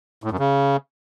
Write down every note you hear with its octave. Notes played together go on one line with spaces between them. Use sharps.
A2
F#2
C#3